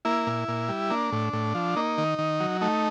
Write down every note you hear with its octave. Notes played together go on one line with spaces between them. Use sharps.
A#3 E4
A#2
A#2
G3
A#3 D4
A2
A2
F3
A#3 D#4
D#3
D#3
F#3
A3 D#4